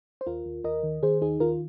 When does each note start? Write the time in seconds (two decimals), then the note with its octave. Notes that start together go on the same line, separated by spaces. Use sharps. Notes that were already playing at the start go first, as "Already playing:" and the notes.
0.21 C5
0.26 D#2 F4 A#4
0.46 D#2
0.64 D#2 A#4 D#5
0.83 D#3
1.03 D#3 G#4 C5
1.21 D#2 D#4 G#4
1.40 D#3 F4 A#4